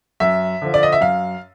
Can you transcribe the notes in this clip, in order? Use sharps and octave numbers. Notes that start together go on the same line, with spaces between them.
F#2 E5
D3 F3
D5
D#5
E5
F#2 F5